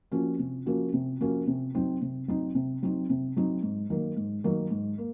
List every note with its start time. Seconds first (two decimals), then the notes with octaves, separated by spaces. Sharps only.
0.12 F3 A#3 C#4 F#4
0.39 C3
0.66 F3 A#3 C#4 F#4
0.93 C3
1.21 F3 A#3 C#4 F#4
1.47 C3
1.75 F#3 C4 D#4
2.01 C3
2.28 F#3 C4 D#4
2.55 C3
2.83 F#3 C4 D#4
3.10 C3
3.37 F#3 C4 D#4
3.62 G#2
3.90 D#3 F#3 A#3
4.16 G#2
4.44 D#3 F#3 A#3
4.70 G#2
4.98 A#3